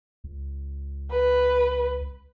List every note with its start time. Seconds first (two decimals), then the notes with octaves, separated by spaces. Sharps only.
0.24 C#2
1.11 B4